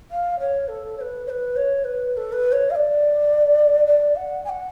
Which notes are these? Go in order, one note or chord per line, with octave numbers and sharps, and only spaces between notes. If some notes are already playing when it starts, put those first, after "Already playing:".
F5
C#5
A4
C#5
B4
C#5
B4
C#5
B4
B4
A4
B4
C#5
F5
D5
D5
F#5
G#5
F#5